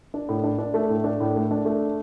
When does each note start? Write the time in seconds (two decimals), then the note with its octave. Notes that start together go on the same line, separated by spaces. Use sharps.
0.14 D4
0.29 A2
0.44 D4
0.58 D4
0.74 A3
0.89 A2
1.04 D4
1.20 A2
1.36 A3
1.51 D4
1.65 A3